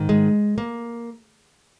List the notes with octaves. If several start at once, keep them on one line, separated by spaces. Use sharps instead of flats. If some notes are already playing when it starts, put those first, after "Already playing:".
Already playing: G#2 D#3
G#3
A#3